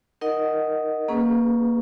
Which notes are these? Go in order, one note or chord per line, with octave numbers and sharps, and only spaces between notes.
D#4 A#4 D#5 F#5
A#3 C#4 G#4 B4